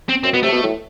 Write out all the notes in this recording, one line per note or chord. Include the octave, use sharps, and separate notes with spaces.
C4
F#2 C4
B2 B3
C3 A3
B2
A2